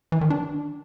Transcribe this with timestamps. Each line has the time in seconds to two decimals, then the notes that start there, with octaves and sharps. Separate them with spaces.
0.12 E3
0.21 D#3
0.30 D4